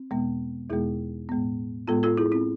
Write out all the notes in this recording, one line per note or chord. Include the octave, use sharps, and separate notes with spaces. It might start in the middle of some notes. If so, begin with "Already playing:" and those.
Already playing: C4
E2 B2 G#3 B3
E2 B2 G#3 B3 E4 G#4
A2 G#3 B3
A2 G#3 B3 F4 A4
F4 A4
E4 G#4
C4 E4